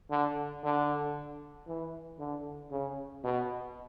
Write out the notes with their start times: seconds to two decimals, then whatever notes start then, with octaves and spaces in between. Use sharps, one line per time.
0.11 D3
0.64 D3
1.68 E3
2.19 D3
2.71 C#3
3.24 B2